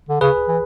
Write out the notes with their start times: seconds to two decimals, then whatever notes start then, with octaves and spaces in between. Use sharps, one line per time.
0.09 D3
0.21 C#3 G#4 B4
0.49 E3